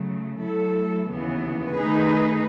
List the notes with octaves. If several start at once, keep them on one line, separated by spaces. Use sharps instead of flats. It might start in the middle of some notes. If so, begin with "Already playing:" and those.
Already playing: C#3 F#3 A3
F#3 A3 E4 A4
D#2 C#3 E3 B3
D#3 A3 D#4 G#4 B4